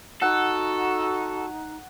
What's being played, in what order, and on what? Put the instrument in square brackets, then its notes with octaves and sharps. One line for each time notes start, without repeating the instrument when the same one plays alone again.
[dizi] D#4 [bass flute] F#4 [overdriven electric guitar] A4 [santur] F#5